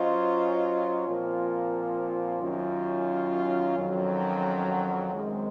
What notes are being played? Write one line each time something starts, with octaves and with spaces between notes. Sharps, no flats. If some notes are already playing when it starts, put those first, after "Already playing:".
Already playing: F#3 C#4 F4 C5 D#5
A#2 F3 C4 F4 A#4
F#2 D#3 F#3 C#4 F4
F2 D#3 F#3 C#4
F#2 D#3 G#3 C4